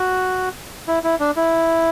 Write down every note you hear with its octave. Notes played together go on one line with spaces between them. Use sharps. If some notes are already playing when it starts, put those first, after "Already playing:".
Already playing: F#4
E4
E4
D4
E4